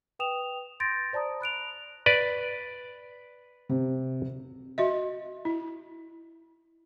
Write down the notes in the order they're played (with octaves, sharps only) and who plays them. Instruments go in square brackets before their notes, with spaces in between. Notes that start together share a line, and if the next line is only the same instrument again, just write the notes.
[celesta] B4 G5 D#6 E7 F7
C6 G6 A6 A#6 D7
C5 D5 A5 A#5 D#6
B5 F#6 D7 F7
[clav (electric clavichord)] B4 D5
[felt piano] C3
[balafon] F#4 D#5 E5
E4